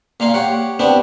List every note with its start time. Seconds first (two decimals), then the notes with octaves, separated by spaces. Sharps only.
0.20 A#2 A#3 F4 F5
0.34 G4 C#5 F#5
0.79 B3 C4 D4 E4 G4